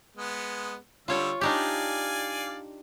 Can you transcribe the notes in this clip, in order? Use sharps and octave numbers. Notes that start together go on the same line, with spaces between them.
G#3 B3
D3 G3 F4 C#5 E6
D4 D#4 G4 D5 F5 G#5